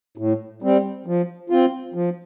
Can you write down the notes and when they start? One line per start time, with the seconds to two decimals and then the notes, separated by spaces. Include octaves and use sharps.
0.18 A2
0.62 G3 C4
1.06 F3
1.50 C4 F4
1.94 F3